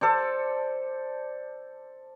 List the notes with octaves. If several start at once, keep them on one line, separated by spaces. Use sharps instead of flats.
A4 C5 D5